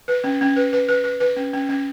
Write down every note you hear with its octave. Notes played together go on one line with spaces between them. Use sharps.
B4
C#4
C#4
B4
B4
B4
B4
B4
C#4
C#4
C#4